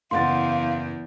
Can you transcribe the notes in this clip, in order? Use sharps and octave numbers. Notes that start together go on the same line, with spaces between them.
F#1 E2 F5 F#5 C6 A6